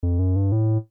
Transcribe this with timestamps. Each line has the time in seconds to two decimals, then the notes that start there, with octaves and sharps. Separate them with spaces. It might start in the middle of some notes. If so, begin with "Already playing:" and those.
0.03 F2
0.19 F#2
0.36 G2
0.52 A2